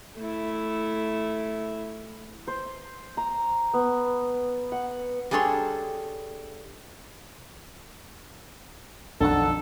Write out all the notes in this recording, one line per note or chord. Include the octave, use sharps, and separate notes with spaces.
A3 E4
C5
A#5
B3
F#5
G3 D4 G#4 A4 C#5 C6
B1 F2 D#3 D4 A4 F#5